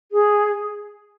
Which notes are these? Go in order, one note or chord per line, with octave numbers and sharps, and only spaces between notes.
G#4